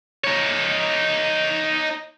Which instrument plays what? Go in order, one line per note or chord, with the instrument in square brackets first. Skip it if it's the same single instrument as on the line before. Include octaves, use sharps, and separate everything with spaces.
[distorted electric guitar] D#4 C#5